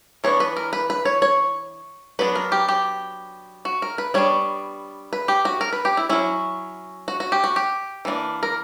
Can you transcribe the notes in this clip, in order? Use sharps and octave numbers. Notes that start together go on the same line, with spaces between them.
E3 B3 D4 C#5
B4
A#4
B4
B4
C#5
C#5
F#3 B3 D4 B4
A#4
G4
G4
F#4
A#4
B4
G3 B3 D4 C#5
B4
G4
F#4
A#4
B4
G4
E4
F#3 C#4 E4
F#4
F#4
G4
F#4
G4
E3 A#3 D4
A#4